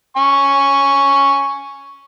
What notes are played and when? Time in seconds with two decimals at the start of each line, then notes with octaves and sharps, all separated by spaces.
0.17 G#5 C#6